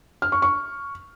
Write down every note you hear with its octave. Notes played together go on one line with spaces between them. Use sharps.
F6
C#6
C#6